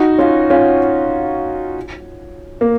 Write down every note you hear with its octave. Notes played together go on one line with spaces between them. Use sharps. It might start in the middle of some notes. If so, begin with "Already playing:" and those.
Already playing: D#4 F#4
C#4 F4
C#4 F4
A#3